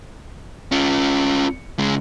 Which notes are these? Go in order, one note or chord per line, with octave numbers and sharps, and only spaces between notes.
C#4 F4
C#3 G#3